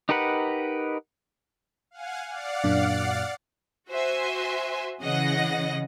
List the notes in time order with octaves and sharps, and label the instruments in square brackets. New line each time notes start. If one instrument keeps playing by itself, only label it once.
[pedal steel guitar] D#4 G4 A#4 B4 F#5
[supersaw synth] F5 F#5 G#5
D5 F5 F#5
[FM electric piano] F#2 A#2 D4
[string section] F#4 C5 E5 G#5 C6
C#3 E3 D#5 F#5 A#6